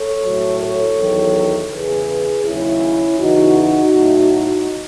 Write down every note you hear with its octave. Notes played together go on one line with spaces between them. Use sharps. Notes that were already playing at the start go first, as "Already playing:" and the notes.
Already playing: A4 C#5
A2 F#3
A4 C#5
E2 D#3 F#3
E2 C#3 E3 G#4 B4
D#2 C#3 F#3 C#4 E4
E2 C#3 E3 D#4 F#4
A2 F#3